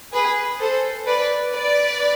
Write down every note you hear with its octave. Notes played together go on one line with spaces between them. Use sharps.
G#4 B4
A4 C5
B4 D5
B4 D5